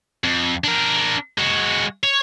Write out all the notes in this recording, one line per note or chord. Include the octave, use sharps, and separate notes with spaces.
F2
D4 A#4
G#3 F#4
C#5